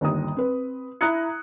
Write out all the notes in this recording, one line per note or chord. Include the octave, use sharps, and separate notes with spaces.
G1 D#2 A#5 D#6
C4 B4
E4 A#5 D#6 F#6 G#6 C#7